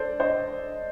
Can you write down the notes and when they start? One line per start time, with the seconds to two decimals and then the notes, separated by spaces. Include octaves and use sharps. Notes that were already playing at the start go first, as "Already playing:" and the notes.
Already playing: A4 C5 D5
0.20 C5 D#5